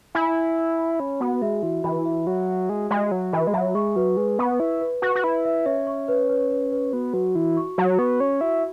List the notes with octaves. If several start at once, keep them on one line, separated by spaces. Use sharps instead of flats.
E4 G#5
G#5
B5
B5
C#4 B5
B3 F#4
G#3 E5
E3 F#4
E3 B5
E5
F#3 E5
E5
G#3 F#4
G#3 E5
F#3 F#4
E3 B5
G#3
F#3 E5
G#3 C#6
F#3 B4
G#3 B4
B3 C#6
E4 B4
B4
F#4 B4
F#4
E4 B4
E5
C#4 E5
C#6
B4
B4
B4
B4
B3 F#4
F#3 F#4
E3 F#4
C#6
F#3 F#4
B3 C#6
C#4 C#6
E4 F#4